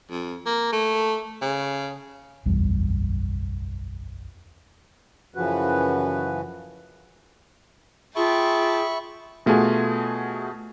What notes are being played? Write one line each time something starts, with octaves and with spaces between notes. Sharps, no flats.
F2
A#3
A3
C#3
F#1 B1 E2 G3
F#2 C#3 E3 F3 F#4 B4
F4 G#4 E5 G5 A5 B5 C#6
B2 A3 F4 G#4 F#5 G#5